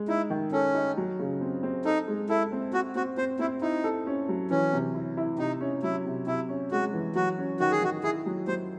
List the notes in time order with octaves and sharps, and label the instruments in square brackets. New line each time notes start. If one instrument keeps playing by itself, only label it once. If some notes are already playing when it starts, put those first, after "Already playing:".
Already playing: [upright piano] G#3
[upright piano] D#4 [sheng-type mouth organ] E4
[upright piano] D#3
[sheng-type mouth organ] C#4 [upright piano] A4
[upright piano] D#4
F#3
C#3
C4
C4
[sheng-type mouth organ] D#4 [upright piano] A4
[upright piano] G#3
[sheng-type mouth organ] E4 [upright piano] A4
[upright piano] C4
[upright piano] C4 [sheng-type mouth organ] F#4
[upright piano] C4 [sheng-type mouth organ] F#4
[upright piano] C4 [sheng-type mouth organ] C5
[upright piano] C4 [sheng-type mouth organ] E4
[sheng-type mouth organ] D#4 [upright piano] E4
[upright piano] A4
C#4
F#3
[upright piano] E3 [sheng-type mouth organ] C#4
[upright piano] C3
E4
E4
[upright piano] C3 [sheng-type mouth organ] D#4
[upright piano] C#4
[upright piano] F#3 [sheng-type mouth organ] E4
[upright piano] C3
[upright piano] C3 [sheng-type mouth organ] E4
[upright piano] C#4
[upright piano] G#3 [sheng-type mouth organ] F#4
[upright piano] E3
[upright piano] F#3 [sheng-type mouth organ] F#4
[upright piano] C#4
[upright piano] D#3 [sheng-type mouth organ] F#4
[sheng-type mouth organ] G#4
[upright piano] D#3 [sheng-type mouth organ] F#4
[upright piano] E4 [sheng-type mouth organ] G#4
[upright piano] F#3
[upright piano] F#3 [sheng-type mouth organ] C5